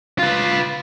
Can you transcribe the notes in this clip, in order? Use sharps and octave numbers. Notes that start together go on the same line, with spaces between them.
F4 B4